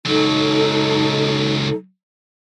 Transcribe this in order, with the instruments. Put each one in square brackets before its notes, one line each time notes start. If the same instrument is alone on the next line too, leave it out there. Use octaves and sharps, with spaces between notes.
[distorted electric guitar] C#2 F#3 [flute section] D#4 A4